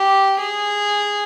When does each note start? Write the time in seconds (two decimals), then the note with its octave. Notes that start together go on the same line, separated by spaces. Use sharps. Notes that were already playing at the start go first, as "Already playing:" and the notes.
Already playing: G4
0.39 G#4